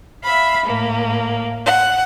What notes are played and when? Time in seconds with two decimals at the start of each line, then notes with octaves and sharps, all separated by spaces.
0.23 E5 F5 B5
0.65 A2 A#3
1.65 F#5